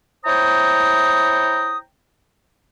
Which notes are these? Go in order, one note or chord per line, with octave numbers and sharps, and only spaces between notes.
E4 C5 C#5 G5 A#5 D#6